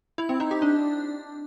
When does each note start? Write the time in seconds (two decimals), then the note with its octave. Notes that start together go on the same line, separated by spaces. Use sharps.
0.18 E4
0.29 C4
0.40 D#4
0.51 G4
0.62 D4